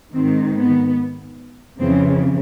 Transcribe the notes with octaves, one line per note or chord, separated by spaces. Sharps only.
G#2 D#3 C4
B3
F2 C#3 E3 C4